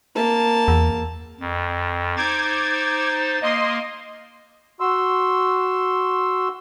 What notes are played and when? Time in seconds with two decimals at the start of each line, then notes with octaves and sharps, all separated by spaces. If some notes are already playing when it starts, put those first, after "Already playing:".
0.15 A#3 A5
0.68 E2
1.41 F2
2.17 D#4 C5 D6 G#6 A6
3.42 A#3 D#5 C6
4.80 F#4 C6 E6